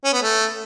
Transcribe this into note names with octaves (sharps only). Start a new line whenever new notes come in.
C#4
B3
A3